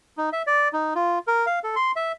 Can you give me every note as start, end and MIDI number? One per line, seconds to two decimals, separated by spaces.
0.17 0.30 63
0.33 0.42 76
0.47 0.68 74
0.73 0.94 63
0.95 1.19 65
1.28 1.46 70
1.46 1.59 77
1.64 1.75 69
1.76 1.92 84
1.96 2.12 76